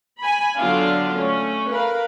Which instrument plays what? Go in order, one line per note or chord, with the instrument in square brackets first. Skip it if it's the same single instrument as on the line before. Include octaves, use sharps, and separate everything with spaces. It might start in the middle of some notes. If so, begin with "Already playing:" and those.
[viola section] G#5 B5
D3 F#3 B3 D4 F4 F5
A3 C#4
A#4 B4 F5